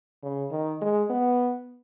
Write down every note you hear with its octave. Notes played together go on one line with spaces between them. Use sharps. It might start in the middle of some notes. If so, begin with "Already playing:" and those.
C#3
D#3
G#3
B3